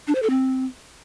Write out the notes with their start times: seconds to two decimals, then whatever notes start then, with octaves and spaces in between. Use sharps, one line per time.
0.08 D4
0.15 C5
0.23 A4
0.30 C4